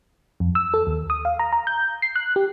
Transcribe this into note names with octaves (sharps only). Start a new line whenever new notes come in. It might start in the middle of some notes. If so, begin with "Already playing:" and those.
F2
E6
A4
D#2
D#6
F5
A#5
A#5
G6
C7
F#6
G4